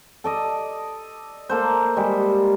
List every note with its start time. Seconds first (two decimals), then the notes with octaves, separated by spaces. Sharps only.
0.24 A4 D5 D#5
1.49 A#3 A4 C5
1.96 G3 G#3